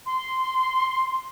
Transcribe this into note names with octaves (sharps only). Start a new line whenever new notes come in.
C6